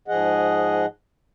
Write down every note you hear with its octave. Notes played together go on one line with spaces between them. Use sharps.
G#2 F3 G#4 D#5 F#5